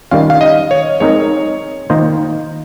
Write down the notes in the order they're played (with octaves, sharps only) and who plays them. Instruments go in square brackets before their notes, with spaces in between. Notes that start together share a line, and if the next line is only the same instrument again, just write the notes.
[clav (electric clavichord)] D#3 G3 C#4 F4 [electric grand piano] F5
[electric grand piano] F5
D#5
C#5
[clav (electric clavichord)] G#3 C4 D#4 A#4 D#5 [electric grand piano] C#5
[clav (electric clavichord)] D#3 A#3 F4 C5 D#5